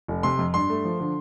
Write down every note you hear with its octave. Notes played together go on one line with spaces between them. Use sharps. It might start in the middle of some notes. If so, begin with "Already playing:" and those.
F1
C3 C6
F2
G2 C6
A3
F3
D3